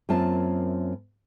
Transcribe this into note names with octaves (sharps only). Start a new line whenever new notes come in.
F#2 A#3 C4 F4 E5 A5